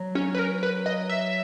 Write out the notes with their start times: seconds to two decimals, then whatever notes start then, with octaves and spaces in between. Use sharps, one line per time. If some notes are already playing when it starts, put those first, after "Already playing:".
Already playing: F#3
0.15 C#4
0.34 B4
0.39 A#4
0.63 B4
0.86 D#5
1.09 E5